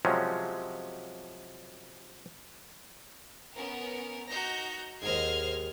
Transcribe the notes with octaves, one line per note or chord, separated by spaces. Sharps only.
C3 F3 F#3 G#3 C#4
B3 C#4 A#4
D#4 F#4 A#5 G6 A#6
D#2 G#2 C5 D#5 F6 G#6 C7